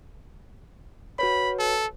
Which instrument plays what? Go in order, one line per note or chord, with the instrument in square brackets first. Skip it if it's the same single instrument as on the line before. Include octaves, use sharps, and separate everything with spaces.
[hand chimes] F#4 B4 C#5 [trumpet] B5
[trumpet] A4